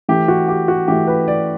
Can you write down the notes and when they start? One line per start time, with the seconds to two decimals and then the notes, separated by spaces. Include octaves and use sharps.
0.09 E3 A3 E4 G4
0.28 F#4
0.48 G4
0.68 F#4
0.88 E3 A3 E4 G4
1.07 B4
1.28 D5